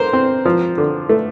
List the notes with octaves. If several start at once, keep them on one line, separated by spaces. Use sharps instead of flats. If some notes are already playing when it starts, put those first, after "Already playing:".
Already playing: D3 A#4 C5
C4
F3
D3
A3